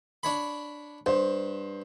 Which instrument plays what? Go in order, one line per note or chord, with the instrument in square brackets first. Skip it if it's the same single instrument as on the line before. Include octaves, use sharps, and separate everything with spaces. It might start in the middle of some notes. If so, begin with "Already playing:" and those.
[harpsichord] D4 C#5 B5
[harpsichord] G2 [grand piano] C5